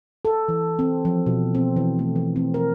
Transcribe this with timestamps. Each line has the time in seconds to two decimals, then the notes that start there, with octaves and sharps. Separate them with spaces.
0.25 A4
0.48 E3
0.79 C4
1.05 F3
1.26 B2
1.55 C4
1.76 E3
1.99 A3
2.16 E3
2.36 C4
2.54 A#4